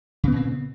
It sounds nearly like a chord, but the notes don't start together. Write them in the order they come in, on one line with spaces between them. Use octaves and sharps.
C#3 B3 A#2 C4